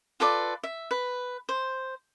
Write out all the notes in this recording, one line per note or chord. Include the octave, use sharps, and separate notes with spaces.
F4 A4 B4 D5
E5
B4
C5